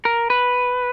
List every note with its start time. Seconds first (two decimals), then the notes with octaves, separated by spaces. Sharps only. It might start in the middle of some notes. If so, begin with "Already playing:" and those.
0.05 A#4
0.30 B4